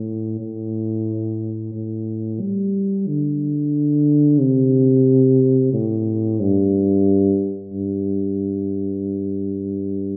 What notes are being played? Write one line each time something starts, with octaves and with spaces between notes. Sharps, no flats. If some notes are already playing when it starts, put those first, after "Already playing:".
Already playing: A2
A2
A2
G3
D3
C3
A2
G2
G2